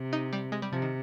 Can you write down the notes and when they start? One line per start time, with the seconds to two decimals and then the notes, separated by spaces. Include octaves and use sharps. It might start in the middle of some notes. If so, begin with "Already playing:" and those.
Already playing: C3
0.13 D#4
0.33 G3
0.52 G#3
0.62 G3
0.72 C3 F3
0.82 D#3